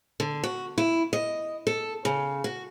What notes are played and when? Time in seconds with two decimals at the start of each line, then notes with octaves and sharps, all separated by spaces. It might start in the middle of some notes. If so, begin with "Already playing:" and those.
0.20 D3
0.44 F#4
0.78 E4
1.13 D#5
1.67 A4
2.05 C#3
2.44 F#4